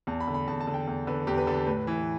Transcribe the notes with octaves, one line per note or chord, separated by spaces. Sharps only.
E2 A5
B5
D3
B5
E2 A5
A5
D3
G5
E2
D3 B4
E2 G4
B4
D3 A4
A2 B4
E3